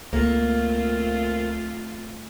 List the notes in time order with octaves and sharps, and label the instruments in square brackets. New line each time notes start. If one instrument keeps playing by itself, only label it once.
[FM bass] C#2 [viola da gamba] A3 C4 F4 [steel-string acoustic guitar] A#3